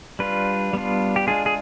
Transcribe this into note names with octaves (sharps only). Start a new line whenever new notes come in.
G3 D4 F4 B4
G3 B3 D4 F4
G4
G#3 D4 F4 G#4
G#4